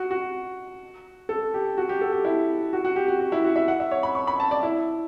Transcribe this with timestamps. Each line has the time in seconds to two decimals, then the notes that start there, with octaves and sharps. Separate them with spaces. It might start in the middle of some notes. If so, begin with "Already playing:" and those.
Already playing: F#4
0.11 F#4
1.29 A4
1.54 G4
1.78 F#4
1.89 G4
2.01 A4
2.13 G4
2.25 E4
2.73 F#4
2.85 F#4
2.96 G4
3.08 F#4
3.20 F#4
3.32 E4
3.44 F#4
3.56 E5
3.68 F#5
3.80 E5
3.91 C#5
4.03 B5
4.15 C#6
4.27 B5
4.40 A5
4.51 D5
4.63 E4